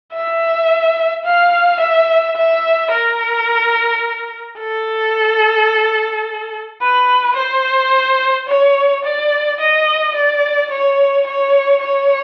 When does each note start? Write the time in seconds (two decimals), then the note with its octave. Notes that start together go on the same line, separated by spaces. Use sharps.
0.13 E5
1.25 F5
1.80 E5
2.36 E5
2.91 A#4
4.59 A4
6.81 B4
7.36 C5
8.48 C#5
9.05 D5
9.60 D#5
10.15 D5
10.71 C#5
11.27 C#5
11.82 C#5